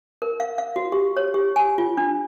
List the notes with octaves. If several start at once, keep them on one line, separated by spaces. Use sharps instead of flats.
A#4
F5
F5
F#4
G4
C#5
G4
G#5
F4
D4